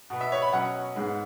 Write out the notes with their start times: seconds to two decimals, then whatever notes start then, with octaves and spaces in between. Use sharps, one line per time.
0.10 B2 B3
0.21 E5
0.32 C#5
0.42 B5
0.52 B2 F#3 C#4 F#5
0.95 G#2 G#3 B3